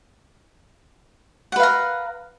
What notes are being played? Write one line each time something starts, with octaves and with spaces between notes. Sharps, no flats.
A#4 B4 F5 F#5